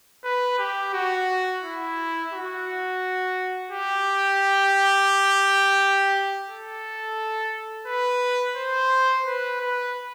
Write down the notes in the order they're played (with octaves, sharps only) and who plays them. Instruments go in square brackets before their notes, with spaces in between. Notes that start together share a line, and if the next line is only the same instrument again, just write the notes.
[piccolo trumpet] B4
G4
F#4
E4
F#4
G4
A4
B4
C5
B4
B4